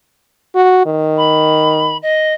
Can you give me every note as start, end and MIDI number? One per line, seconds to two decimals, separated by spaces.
0.56 0.83 66
0.86 1.98 51
1.17 1.97 83
2.02 2.33 75